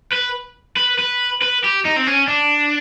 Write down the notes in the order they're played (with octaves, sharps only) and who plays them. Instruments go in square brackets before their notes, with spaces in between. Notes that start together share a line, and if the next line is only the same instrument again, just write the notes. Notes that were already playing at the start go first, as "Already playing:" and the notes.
[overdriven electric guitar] B4
B4
B4
B4
G4
D#4
C4
C#4
D4